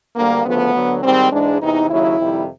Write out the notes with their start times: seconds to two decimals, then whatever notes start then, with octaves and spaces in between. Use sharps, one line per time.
0.15 D2 D3 G3 A#3
0.45 D2 C#3 F3 A3 B3
0.74 D2 D3 F#3
1.03 G#2 D#3 G3 C4
1.31 G#2 E3 G#3 D4
1.60 E2 C3 E3 D#4
1.89 D#2 C#3 F#3 E4
2.19 F2 C3 D#3 G3